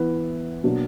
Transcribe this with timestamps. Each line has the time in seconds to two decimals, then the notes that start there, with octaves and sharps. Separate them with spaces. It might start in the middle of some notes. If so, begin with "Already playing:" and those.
Already playing: E3 B3 E4 B4
0.63 B2 F#3 A#3 D4 F#4